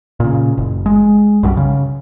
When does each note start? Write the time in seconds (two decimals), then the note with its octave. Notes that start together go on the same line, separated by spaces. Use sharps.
0.20 A#2 C#3
0.58 F#1
0.86 G#3
1.43 B1 F#2 F#3 G3
1.57 C#3